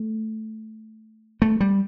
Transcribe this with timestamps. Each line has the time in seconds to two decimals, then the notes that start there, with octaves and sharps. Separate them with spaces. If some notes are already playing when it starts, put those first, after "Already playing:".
Already playing: A3
1.42 A3
1.60 G3